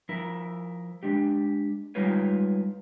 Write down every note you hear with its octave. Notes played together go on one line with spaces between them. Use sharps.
F3 E4 A#4
G#3 D4 G4
G3 G#3 D#4 F4 B4 C#5